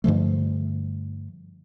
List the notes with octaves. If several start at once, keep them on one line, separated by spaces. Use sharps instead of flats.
G2 D3 F3 A3